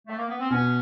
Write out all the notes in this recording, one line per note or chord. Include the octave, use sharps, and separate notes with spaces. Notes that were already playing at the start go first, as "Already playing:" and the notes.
A3
A#3
B3
C4
B2 B3 C#4